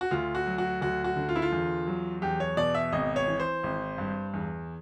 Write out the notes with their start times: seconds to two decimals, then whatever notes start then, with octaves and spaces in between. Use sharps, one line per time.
0.01 F#4
0.11 D2 F4
0.35 F#4
0.46 F#3
0.58 F#4
0.81 D2 F#4
1.04 F#4
1.16 D3
1.29 F4
1.36 E4
1.42 F4
1.52 E2
1.87 F#3
2.22 E2 G4
2.40 C#5
2.57 B2 D5
2.75 E5
2.93 G#1 D#5
3.16 C#5
3.28 E3
3.40 C5
3.63 G#1
3.98 G2
4.34 E2